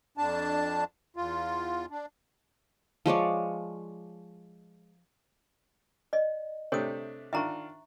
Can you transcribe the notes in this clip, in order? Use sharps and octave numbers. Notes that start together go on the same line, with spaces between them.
F2 D4 A5
E2 F4
D4
F3 G#3 C#5 D5
D5 D#5
C3 A3 D4 C#5 D#6
D#3 D4 F4 E5 A#5 C#6